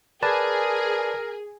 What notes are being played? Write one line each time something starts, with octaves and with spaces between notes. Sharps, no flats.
G#4 A#4 B4 D5 A5